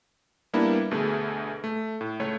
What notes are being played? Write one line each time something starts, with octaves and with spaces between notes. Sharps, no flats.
G3 A#3 B3 D4 E4
D2 B2 A3 G#4
A3
A2
C#2 A3 C#5